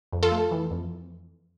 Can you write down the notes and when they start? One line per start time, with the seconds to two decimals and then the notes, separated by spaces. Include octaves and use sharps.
0.13 F2
0.23 F4 A4
0.32 A3
0.51 E3
0.71 F2